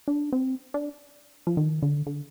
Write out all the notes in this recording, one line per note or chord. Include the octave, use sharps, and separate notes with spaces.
D4
C4
D4
F3
D#3
D3
D3